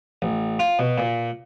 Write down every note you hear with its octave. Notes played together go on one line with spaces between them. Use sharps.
A1
F4
B2
A#2